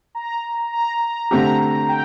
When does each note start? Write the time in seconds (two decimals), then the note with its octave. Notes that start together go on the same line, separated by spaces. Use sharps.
0.15 A#5
0.73 A#5
1.01 A#5
1.31 D3 A3 C4 G4 A#5
1.88 G5